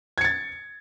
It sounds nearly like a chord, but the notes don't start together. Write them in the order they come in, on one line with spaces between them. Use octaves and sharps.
G#6 C#7 A6